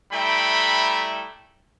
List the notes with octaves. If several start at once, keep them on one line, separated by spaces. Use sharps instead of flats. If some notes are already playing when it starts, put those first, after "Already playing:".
G3 A3 E4 G5 A#5 B5